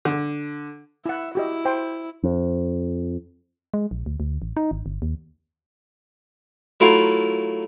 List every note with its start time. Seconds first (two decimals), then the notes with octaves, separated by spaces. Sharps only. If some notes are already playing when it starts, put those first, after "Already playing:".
0.05 D3
1.06 E4 E5 F#5
1.35 E4 F#4 G4 D#5
1.65 C5 G5
2.23 F2
3.74 G#3
3.91 A#1
4.06 D2
4.20 D2
4.42 A1
4.57 D#4
4.71 G#1
4.86 G1
5.02 D#2
6.80 F#3 A3 E4 F4 A#4 F5